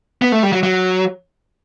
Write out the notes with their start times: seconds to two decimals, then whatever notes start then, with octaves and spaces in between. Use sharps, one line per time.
0.22 B3
0.32 A3
0.43 G3
0.53 F#3
0.63 F#3